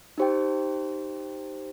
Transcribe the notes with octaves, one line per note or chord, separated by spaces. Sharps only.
D#4 G4 C5 G5